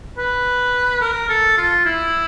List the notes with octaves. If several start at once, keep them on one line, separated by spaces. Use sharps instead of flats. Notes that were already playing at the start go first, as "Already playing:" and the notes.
B4
A#4
A4
F4
E4